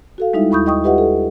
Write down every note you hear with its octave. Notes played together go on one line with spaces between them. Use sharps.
F#4 A4 F5
G3 G#3 D#4 E4 E5
D#2 E4 B5 C#6 D#6 G6
D#5 G5 C#6 D#6
F4 G4 B4 D#5 E5 F#5
A4